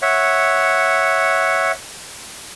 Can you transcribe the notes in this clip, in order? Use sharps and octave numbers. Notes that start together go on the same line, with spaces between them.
C#5 E5 F#5